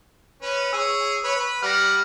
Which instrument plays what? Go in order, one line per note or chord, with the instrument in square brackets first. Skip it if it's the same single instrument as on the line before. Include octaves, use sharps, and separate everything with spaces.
[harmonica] C#4 B4
[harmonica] G#4 C#5 [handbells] E6
[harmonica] B4 C#5
B4
[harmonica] G3 F#5 [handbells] F6 A#6